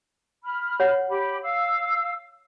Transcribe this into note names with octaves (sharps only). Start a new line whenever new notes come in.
B5 F6
C#5 F#5
G4 B5
F5 E6